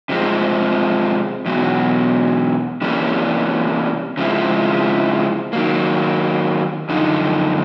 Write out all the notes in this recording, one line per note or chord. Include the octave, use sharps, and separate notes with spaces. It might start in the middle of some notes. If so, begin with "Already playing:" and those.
C3 F3 G#3 C4
E2 B2 F#3
C3 E3 G3 A#3 C#4
C#3 F3 G#3 C4 E4
D#3 F#3 A#3
F#2 D3 F3 D#4